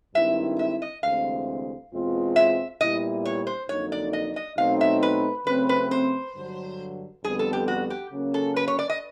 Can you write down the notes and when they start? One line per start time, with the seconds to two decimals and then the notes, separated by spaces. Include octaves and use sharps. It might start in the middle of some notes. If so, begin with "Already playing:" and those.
0.15 G2 D#3 G#3 C4 E4 E5
0.59 E5
0.82 D#5
1.03 D2 C3 E3 G#3 C4 F5
1.92 E2 B2 G#3 C4 F4
2.36 E5
2.80 A#2 G3 B3 E4 D#5
3.25 C#5
3.47 C5
3.69 F2 D3 F#3 A#3 D#4 C#5
3.92 D5
4.13 D#5
4.36 D#5
4.58 B2 F#3 A3 C4 D#4 F5
4.81 E5
5.03 B4
5.46 C#3 F#3 A3 C4 B4
5.69 B4
5.91 C5
6.35 G2 D3 F#3
7.24 F2 D3 G3 B3 G#4
7.39 A4
7.53 G4
7.68 F#4
7.90 G4
8.12 C#3 F#3 A#3 C#4
8.34 A4
8.56 B4
8.68 C#5
8.79 D5
8.90 D#5